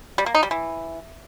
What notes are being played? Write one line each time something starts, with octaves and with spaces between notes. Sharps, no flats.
G3
A#3
D#4
G3
E3